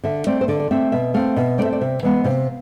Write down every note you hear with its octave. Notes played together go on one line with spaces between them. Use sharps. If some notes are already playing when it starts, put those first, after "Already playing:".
D3 E5
A3 C4 D5
C5
D3 D5
D5
A3 C4 E5
B2 E5
A3 C4 F5
B2 E5
A3 C4 D5
E5
D5
C3 E5
E3 G#3 B3
C3 F5